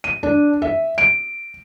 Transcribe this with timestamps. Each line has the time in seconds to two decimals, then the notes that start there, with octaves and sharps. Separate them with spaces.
0.04 D#7
0.23 D4
0.62 E5
0.98 D7